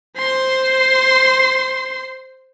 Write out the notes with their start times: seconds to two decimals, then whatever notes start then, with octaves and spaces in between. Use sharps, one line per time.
0.18 C5 C6